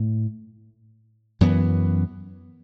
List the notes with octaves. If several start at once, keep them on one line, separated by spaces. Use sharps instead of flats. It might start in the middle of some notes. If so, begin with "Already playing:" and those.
Already playing: A2
F#2 E3 B3